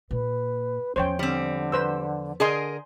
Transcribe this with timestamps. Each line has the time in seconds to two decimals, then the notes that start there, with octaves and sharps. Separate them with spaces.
0.11 A#2 B4
0.96 E2 F3 C#4 C5 C#5 G5
1.19 D3 G3 C4
1.72 B4 C5 E6
2.40 D3 G#4 A#4 D5 D#5 G#5 C6